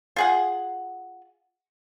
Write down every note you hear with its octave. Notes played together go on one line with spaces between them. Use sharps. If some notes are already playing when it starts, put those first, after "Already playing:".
F4 G#4 F#5